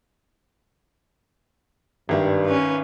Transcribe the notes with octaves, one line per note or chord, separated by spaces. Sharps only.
G#1 G2 D#3 E5
C#4 B4